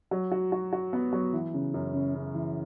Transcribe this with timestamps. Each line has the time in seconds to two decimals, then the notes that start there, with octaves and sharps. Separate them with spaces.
0.11 F#3
0.32 F#4
0.52 F#4
0.73 F#4
0.93 B3
1.13 F#3
1.33 E3
1.54 C#3
1.74 F#2
1.94 C#3
2.15 C#3
2.34 E3